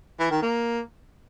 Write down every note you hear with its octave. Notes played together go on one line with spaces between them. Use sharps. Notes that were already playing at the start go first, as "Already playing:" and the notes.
E3
D#3
A#3